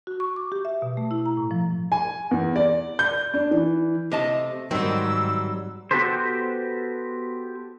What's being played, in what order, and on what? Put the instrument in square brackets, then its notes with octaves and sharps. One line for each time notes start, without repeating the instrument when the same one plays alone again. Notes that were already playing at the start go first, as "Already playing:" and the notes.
[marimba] F#4
C#6
D6
G4
E5
B2
A3
E4
A#5
A2
F3
[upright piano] G#5
E2
D5
G6
D4
E3
[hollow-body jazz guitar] C3 D#5 A5 [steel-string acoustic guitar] A3
[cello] G#2 [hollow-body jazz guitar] D#3 C4 [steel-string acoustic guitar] F#3 G3 [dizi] E6
[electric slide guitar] B3 F#4 G4 A4 B4 C5